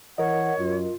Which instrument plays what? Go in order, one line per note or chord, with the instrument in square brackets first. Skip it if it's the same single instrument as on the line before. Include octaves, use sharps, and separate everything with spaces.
[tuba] E3 [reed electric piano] A#4 D#5 [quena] C#5 [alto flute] F#5
[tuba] F#2 [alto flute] F4